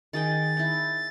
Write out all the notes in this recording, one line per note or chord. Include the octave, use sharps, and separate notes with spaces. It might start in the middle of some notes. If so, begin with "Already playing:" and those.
D#3 G#4 G5 A6
D#4 E4